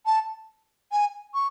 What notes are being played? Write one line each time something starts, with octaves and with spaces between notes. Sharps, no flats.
A5
G#5
C#6